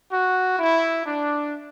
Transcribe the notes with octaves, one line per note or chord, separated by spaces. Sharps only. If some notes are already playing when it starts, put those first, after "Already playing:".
F#4
E4
D4